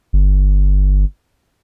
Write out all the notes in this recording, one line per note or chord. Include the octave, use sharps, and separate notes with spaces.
G1